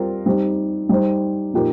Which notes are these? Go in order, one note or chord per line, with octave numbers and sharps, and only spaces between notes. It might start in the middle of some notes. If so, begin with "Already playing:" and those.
Already playing: G3 C4 F4 A#4
G3 C4 D#4 G4
G3 D#4 C5
A#2 F3 D#4 G4 A#4